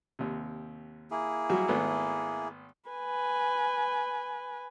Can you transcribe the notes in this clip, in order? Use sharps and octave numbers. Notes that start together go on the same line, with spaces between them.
D#2 C3
A#3 E4 G#4
F#3 G3 F#4
G#1 A3 B3
B4 G#5